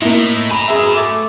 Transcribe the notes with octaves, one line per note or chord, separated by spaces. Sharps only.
A2 A#3 D#4 E4
G#5 A#5 B5
F#2 B2 G#4 E5
A3 D6